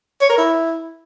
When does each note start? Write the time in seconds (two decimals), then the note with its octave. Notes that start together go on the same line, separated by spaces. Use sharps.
0.21 C#5
0.29 A#4
0.38 E4